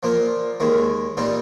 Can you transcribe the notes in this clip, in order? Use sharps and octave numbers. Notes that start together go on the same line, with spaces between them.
A#2 F3 A#3
D#2 D#3 G#3
A#2 G3 C4 D#4